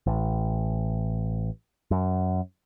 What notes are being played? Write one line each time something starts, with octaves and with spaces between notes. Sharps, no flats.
A1
F#2